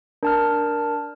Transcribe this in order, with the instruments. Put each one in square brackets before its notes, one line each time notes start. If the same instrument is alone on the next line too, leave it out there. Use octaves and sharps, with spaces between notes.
[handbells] D4 A5 F6 [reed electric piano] A#4